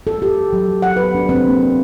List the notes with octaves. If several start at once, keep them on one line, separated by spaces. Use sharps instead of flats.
A4
G4
F#3
F#5
B4
D4
C4
A#3